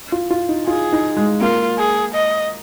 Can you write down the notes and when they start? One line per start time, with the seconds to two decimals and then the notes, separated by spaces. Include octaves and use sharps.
0.12 F4
0.31 F4
0.49 D#4
0.67 F4 G#4
0.93 D#4
1.17 G#3
1.41 A#3 F4
1.78 G#4
2.14 D#5